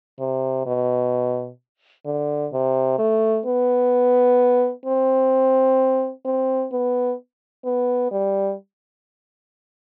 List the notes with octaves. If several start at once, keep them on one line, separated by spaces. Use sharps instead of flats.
C3
B2
D3
C3
A3
B3
C4
C4
B3
B3
G3